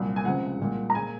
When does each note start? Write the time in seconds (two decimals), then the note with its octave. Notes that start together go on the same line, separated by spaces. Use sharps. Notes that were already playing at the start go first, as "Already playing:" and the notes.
Already playing: C2 A#2 F#3
0.16 G#5
0.25 C#2 C3 F3 G#3 F#5
0.59 C2 A#2 G#3
0.90 A#5
0.94 A#2 G#3 G#5